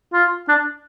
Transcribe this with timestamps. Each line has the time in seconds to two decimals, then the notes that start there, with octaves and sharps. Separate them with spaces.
0.13 F4
0.49 D4